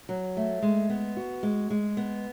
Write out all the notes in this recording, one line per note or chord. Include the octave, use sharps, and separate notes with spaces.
F#3
A3
G#3
B3
F#4
G#3
G#3
B3